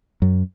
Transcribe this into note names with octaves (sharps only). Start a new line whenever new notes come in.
F#2